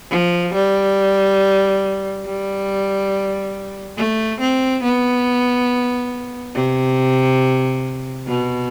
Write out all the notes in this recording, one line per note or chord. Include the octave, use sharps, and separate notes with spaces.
F3
G3
G3
A3
C4
B3
C3
B2